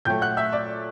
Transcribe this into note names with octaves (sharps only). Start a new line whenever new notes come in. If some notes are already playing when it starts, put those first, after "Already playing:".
A#2 F#3 A3 G5 G6
F#5 F#6
E5 E6
D5 D6